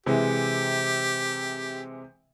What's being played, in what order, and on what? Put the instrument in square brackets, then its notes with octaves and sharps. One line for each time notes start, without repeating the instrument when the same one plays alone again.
[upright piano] C3 E3 G#3 [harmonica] G4